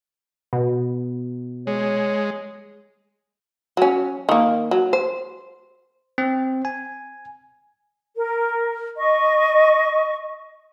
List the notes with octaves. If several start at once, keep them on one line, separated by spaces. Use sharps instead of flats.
B2
G#3 C#5
F#3 C#4
D#3 A#3
F#3
C5
C4
G#5
A#4
D#5 C#6